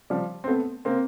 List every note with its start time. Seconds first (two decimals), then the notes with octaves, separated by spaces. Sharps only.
0.10 F3 G3
0.44 C4
0.48 A3 B3
0.85 A#3 C4